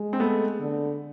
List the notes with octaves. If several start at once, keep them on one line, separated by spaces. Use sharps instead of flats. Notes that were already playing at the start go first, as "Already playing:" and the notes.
Already playing: G#3
C4
A3 B3
D3